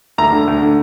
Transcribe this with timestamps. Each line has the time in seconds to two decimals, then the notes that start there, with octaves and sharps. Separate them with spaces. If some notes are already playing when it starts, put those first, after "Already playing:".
0.18 D2 A#5
0.33 D3
0.48 D2
0.62 D3